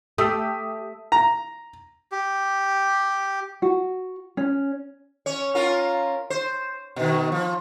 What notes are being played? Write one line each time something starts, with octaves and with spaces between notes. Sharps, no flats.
A3 G4 D#6 E6 B6
A#5
G4
F#4
C#4
C#4 C#5
C#4 F4 A#4
C5
B2 D#3
F3